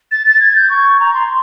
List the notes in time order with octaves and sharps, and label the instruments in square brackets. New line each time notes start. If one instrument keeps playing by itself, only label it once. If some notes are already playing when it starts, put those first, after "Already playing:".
[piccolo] A6
A6
G#6
G6
C#6
A#5
C6